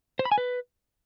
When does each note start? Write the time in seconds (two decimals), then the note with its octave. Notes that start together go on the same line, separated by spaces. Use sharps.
0.19 C5
0.25 B5
0.32 G#5
0.38 B4